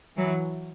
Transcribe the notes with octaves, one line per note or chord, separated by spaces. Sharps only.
E3 F#3